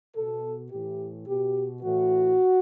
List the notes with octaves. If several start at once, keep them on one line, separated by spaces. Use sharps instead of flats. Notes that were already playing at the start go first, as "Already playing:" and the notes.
B2 A4
A2 E3 G4
B2 G4
A2 E3 F#4